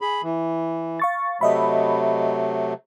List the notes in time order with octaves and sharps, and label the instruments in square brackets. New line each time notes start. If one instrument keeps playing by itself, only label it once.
[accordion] G#4 B5
E3
[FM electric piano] F5 C#6 A6
[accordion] C3 F#3 A3 [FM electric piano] D#5 E5 B5